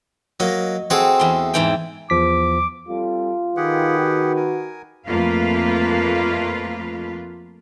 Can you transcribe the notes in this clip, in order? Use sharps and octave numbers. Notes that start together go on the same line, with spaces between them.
F#3 A#3 D#5
C4 F#4 G#4 A4
E2 C6
G#2 E3 G5
E2 F3 D6 B6
G3 C4 F4 A4
D#3 G4 G#4 B4 F#5
F#4
A#4 G#5
F2 A3 A#3 F4 B4 F5